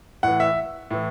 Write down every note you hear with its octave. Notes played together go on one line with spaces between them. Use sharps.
A2 E3 F#5
E5
A2 E3